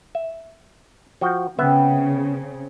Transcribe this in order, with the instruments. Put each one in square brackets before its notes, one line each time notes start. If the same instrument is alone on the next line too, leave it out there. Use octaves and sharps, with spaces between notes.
[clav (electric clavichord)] E5
F3 F#4 G5
[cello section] C#3 [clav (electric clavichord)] B3 B4 E5 [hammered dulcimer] C4